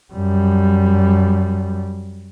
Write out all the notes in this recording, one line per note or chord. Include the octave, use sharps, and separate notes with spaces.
F#2 G3